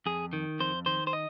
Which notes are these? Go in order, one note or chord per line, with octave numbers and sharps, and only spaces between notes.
F2 G#4
D#3
F2 C5
D#3 C5
C5
D#5